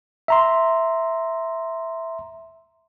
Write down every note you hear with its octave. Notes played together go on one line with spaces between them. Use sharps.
E5 A#5 C6